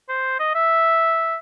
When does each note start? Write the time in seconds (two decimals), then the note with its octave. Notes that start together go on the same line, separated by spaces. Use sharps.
0.09 C5
0.39 D#5
0.55 E5